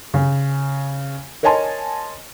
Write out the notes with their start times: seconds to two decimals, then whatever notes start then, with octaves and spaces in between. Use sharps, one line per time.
0.14 C#3
1.43 A#4 C#5 D#5 G#5 A5 C6